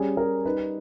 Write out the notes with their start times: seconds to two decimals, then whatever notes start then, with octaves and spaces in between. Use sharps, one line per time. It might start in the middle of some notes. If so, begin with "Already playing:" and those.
Already playing: G3 C#4 G#4
0.17 G3 A#4
0.45 D#4 B4